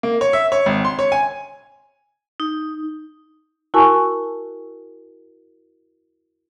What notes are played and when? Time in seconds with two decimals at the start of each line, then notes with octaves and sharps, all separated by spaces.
0.03 A#3
0.21 C#5
0.33 E5
0.52 C#5
0.66 G#1
0.85 C6
0.99 C#5
1.12 G#5
2.40 D#4
3.74 E4 F#4 A#4 G#5 A5 C#6